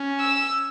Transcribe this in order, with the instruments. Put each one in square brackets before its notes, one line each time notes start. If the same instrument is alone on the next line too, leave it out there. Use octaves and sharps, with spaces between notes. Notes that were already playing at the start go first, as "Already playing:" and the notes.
Already playing: [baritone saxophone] C#4
[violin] E6